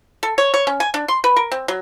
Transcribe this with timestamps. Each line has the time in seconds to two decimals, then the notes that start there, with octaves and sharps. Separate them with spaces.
0.23 A4
0.38 C#5
0.54 C#5
0.67 C#4
0.80 G#5
0.94 D4
1.08 C6
1.24 B4
1.36 A#4
1.52 C4
1.68 F#3